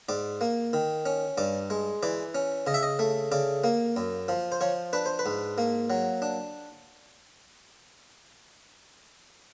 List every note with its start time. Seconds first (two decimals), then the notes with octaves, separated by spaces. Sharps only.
0.09 G#2 D5
0.41 A#3
0.73 D#3
1.06 C#4
1.38 G2 D5
1.70 G#3
2.03 E3 D5
2.35 C#4
2.67 C#3 D#5
2.74 E5
2.83 D#5
2.99 A3
3.32 C#3 D5
3.64 A#3
3.96 F#2
4.28 F3
4.52 C5
4.61 F3 C#5
4.93 D4 B4
5.06 C5
5.19 B4
5.26 G#2
5.58 A#3
5.90 F#3
6.22 D4